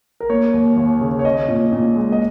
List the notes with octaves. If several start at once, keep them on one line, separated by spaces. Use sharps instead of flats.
A#4
A#3 C#5
D#2
D#2
C#3
C#5
C#4 D#5
A#2
A#2
G#3
D#5